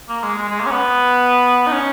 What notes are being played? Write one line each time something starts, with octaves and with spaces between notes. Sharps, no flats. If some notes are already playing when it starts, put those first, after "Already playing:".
A#3
G#3
G#3
G#3
A#3
C#4
B3
D#4
C#4